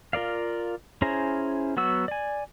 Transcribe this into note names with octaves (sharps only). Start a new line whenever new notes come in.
F4 A#4 D5 F5
C#4 E4 G#4 C5 A#5
F#3 B3 F#4 E6
D5 G#5